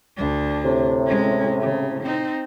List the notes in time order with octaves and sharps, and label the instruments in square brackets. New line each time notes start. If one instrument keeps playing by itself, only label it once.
[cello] D2 D4
[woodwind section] A2 C3
[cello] G#3 C#4
C#3
C4 D#4